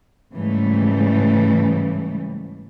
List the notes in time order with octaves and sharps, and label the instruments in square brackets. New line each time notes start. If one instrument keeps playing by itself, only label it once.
[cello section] G#2 C#3 E3 G3 A3